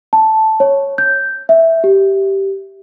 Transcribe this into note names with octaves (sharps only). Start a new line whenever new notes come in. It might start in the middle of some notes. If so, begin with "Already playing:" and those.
A5
C#5
G6
E5
G4